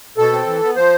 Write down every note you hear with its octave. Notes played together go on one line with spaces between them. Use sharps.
B2 A4
C4
E3
B3
F3 C5